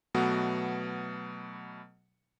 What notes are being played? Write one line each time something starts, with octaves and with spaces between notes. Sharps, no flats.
B2 F#3 A3 B3 F#4